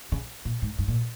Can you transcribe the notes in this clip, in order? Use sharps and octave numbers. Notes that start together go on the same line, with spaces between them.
C#3
A#2
G#2
G2
A#2